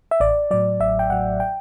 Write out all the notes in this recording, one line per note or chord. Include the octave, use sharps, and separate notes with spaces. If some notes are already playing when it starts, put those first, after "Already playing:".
E5
A1 D5
A2 F#3 D5
A1 E5
G5
A2 F#3 F#5
G5